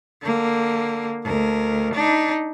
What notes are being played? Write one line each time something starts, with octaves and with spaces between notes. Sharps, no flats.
D3 A#3
D2 A#4
D4 D#4